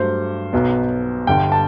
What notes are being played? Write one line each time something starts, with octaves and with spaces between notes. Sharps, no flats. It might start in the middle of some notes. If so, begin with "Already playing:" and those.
Already playing: G2 F#3 A3 C5
B1 B2 F#3 B3
G1 G2 D3 G5
A5